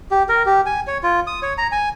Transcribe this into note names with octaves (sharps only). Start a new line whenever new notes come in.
G4
A#4
G4
G#5
C#5
F4
D#6
C#5
A#5
G#5